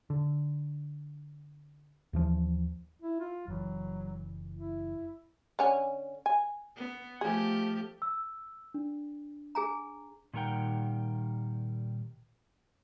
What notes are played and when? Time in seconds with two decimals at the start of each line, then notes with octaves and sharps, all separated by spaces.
0.10 D3
2.13 D#2 E3 F3
3.02 E4
3.20 F4
3.48 F#1 E3 F#3
4.55 E4
5.59 D3 C#4 G#5
6.26 G#5
6.76 B3
7.21 F3 A3 G4 G#4
8.02 E6
8.74 D4
9.55 G#4 G#5 A#5
10.34 A#2 D#3 G3 A#4 F#5 G5